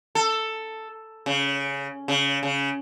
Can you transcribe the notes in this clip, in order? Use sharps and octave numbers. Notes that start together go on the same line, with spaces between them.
A4
C#3
C#3
C#3